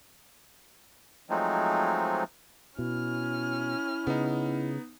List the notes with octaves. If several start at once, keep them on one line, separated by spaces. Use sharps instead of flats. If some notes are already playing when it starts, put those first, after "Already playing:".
F3 F#3 G#3 A3 C4 D#4
B2 C#4 E4 F6
C#3 B3 D#4